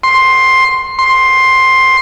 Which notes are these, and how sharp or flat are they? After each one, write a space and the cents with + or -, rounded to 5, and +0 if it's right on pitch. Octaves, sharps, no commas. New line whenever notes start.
C6 +10
C6 +10